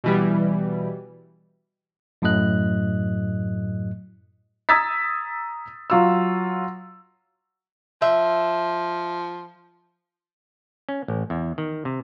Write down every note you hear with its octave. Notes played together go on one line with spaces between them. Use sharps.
B2 E3 G3
F#2 A2 F#3 A3 D#5 F#6
A#5 D#6 E6 G#6 A6 B6
F#3 F4 E6
F3 E5
C#4
A1
E2
D#3
C3